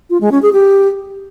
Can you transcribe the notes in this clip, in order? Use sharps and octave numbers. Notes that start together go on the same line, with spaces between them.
F4
G#3
C#4
G#4
G4